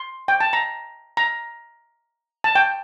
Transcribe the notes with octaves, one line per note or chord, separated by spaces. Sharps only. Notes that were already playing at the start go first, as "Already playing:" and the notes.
Already playing: C6
G5
A5
A#5
A#5
A5
G5